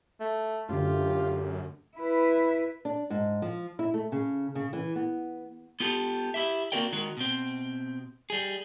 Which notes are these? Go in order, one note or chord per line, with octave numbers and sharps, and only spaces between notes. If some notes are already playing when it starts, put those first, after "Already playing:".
A3
F#2 D3 A3 F4 G4
E4 B4
D4
G#2
F3
E4
A3
C#3
C#3
E3
B3
B3 F4 G4 A4
E4 G4 E5
A#3 C4 F#4 A#4 D5 G5
D#3 G#3 F#4 A#4
B2 C4
G3 G#4